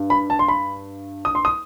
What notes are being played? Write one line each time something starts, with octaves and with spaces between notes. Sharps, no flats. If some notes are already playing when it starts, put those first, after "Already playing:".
Already playing: G2
B5
A5
C6
B5
D#6
C6
D#6